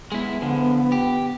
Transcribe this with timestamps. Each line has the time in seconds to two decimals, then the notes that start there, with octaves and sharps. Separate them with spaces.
0.12 G#3 B3 E4
0.42 D3 F3 B3
0.92 G4